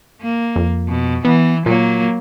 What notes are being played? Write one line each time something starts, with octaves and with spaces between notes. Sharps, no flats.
A#3
F2
B2
E3 B3
A#2 F#3 A#3